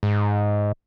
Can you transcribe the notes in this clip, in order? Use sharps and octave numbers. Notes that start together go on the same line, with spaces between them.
G#2